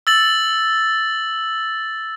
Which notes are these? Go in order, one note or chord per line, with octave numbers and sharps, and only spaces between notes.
E6 A6 F#7